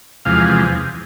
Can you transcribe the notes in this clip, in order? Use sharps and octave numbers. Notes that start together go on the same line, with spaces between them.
E2 C3 F3 G#3 F5